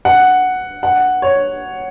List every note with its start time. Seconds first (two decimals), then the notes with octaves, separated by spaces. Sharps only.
0.05 F#5
0.83 F#5
1.22 C#5